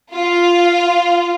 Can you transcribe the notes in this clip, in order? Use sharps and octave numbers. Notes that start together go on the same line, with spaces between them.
F4